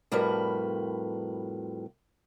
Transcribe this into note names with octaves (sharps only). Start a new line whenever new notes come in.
F2 A2 G3 F#4 A#4 B4